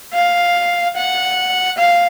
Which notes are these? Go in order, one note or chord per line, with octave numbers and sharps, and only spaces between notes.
F5
F#5
F5